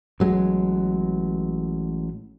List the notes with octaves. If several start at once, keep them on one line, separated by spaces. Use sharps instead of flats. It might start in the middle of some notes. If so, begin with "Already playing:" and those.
A1 F#3 G#3